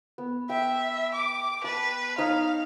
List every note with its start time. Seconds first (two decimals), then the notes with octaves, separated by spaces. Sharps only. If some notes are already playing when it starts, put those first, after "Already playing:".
0.18 B3
0.50 E5 G5
1.14 D6
1.64 B4 A5
2.18 D#4 C#5 F5